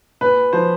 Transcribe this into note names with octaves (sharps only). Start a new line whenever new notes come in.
A#2 B4
F3 C5